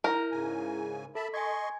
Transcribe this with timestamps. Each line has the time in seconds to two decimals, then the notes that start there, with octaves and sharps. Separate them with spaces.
0.04 E4 A#4 A#5 G6
0.31 G#2 C#3 G#5
1.15 A4 E5 A5 B5 B6
1.34 D#5 G#5 C6 C#6 G#6